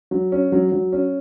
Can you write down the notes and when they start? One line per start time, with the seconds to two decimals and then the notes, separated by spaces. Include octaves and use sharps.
0.11 F#3
0.32 C#4
0.52 F#3
0.72 F#3
0.92 C#4